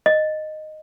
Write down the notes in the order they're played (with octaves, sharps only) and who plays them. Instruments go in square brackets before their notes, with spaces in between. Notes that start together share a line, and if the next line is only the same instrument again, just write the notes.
[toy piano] D#5